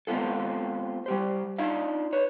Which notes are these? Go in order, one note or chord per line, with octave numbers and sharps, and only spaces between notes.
G#3 B3 C4 F4 A4
G3 G4 C5
D4 D#4 F4 D#5 F5
B4 C#5